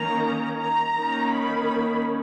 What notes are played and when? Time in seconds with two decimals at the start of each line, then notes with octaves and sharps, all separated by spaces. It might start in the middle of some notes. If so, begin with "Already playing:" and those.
Already playing: D#3 A#3 C#4 A#5
0.57 A#5
0.95 D#3 A#3 C#4
1.33 B5